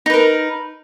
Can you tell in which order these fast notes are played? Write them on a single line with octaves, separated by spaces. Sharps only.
D#4 B4 A#4